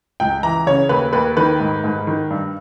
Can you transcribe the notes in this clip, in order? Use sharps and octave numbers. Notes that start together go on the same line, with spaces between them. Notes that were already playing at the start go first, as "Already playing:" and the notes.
C#2 G5
E3 A#5
C#3 C#5
D#2 B4
D#2 B4
D#3 B4
G#2
G#2
D#3
G2